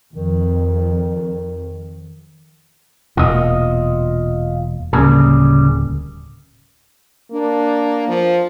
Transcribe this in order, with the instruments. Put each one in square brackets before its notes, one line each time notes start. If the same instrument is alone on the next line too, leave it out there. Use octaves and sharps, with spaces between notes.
[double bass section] F2 [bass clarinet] D#3
[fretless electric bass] E1 A#2 [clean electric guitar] F4 D#5
[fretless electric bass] D1 A#3 [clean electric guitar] C#3 G3 G#4
[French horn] A#3 [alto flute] D4
[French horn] F3